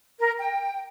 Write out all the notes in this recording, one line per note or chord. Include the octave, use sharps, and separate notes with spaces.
A#4
G5